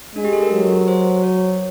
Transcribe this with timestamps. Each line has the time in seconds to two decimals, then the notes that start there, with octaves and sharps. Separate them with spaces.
0.15 G#3 D4
0.25 G4
0.33 A4
0.43 A#4
0.52 F#3
0.88 C5
1.24 C#5